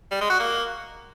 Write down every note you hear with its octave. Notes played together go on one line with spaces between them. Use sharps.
G3
G#3
F#4
A#3